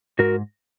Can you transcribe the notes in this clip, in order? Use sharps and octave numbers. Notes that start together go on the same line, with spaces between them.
G#2 F#4 A#4